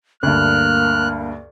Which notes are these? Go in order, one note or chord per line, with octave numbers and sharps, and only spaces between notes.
D2 G2 A#3 F6 F#6